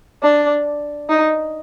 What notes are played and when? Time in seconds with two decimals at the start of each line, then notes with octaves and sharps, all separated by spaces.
0.23 D4
1.09 D#4